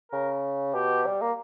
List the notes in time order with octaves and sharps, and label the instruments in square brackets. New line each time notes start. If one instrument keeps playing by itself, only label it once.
[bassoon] C#3 [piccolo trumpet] A#4
[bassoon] B2 [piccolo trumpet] G4
[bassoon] G3
A#3